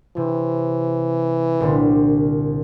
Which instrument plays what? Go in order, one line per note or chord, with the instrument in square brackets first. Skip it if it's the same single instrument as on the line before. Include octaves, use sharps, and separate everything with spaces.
[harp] C3 [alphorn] E3
[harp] C2 A#2 D3